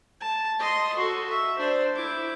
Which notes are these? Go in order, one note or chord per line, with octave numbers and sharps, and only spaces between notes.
A5
D#5 C6
F#4 A4
E5
D4 C5
E4 D6